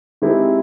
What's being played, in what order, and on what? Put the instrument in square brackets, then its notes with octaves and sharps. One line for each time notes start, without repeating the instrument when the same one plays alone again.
[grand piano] D#3 G#3 C4 E4 G4